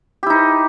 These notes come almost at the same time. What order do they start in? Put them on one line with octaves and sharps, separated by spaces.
G4 E4 D#4